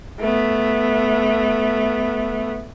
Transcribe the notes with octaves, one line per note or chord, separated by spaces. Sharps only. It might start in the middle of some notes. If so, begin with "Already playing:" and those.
A3 B3